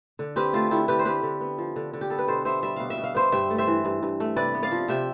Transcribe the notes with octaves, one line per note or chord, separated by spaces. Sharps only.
D3
C4 G4 B4
A3 F4 A4
D3 E4 G4
D3 G4 B4
C5
C4 G4 B4
D3
B3
F3
D3
D3
G4
B3 A4
B4
B2 A4 C5
B3 C5 E5
G3 E5
B2 F5
E5
B2
F5
B3 C5 E5
G2 E5 G5
A3
C5 E5
E3
G2
G2
A3
C3 B4 D5
B3
D5 F5
F3
C3 E5 G5